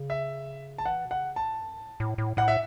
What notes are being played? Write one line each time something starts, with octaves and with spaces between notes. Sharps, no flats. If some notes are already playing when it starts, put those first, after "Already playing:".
Already playing: C#3
E5
A5
E3 F#5
B2
C#3 F#5
A2 A5
F#2
A2
A2
A2
A2 F#5
E5